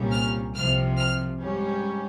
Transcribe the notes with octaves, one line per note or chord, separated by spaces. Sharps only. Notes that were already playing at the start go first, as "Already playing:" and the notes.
Already playing: C2 A#2 G3 C#4
F6
C2 C3 F3 F6
F6
G#2 G3 C#4